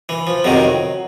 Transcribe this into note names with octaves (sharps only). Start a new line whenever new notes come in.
E3
F3
F2 C3 D#3 F#3